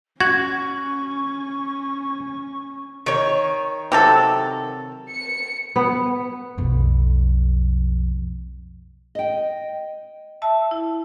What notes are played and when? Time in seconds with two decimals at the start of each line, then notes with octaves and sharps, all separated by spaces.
0.20 C#4 F#4 C#6 G#6 F#7
3.06 D#3 C#5
3.92 C3 F#3 A4
5.09 C#7
5.76 B3
6.58 B1 F2
9.15 D#5 G5
10.42 E5 A5 E6
10.71 E4